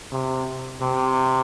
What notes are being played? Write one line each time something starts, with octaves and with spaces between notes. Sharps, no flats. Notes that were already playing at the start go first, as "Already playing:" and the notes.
C3
C3